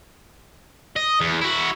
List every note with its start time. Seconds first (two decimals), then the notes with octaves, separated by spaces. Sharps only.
0.96 D#5
1.21 E2
1.41 E4 F#4